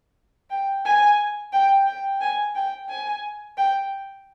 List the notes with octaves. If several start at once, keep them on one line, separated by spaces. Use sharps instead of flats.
G5
G#5
G5
G5
G#5
G5
G#5
G5